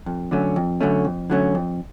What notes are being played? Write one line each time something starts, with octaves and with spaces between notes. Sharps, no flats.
F2
D3 F#3 A3 C#4
F2
D3 F#3 A3 C#4
F2
D3 F#3 A3 C#4
F2